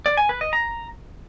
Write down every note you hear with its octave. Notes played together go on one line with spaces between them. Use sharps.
D5
G#5
B4
D#5
A#5